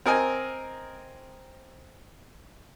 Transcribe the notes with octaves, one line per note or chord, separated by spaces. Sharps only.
C4 A#4 D#5 G#5